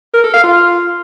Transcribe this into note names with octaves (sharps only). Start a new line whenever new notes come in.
A#4
A4
F5
F4